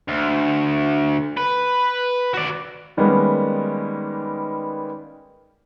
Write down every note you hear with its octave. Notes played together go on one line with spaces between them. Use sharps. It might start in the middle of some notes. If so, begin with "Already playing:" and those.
D2
B4
F#4 D5
D#3 G3 G#3 A#3 B3 C#4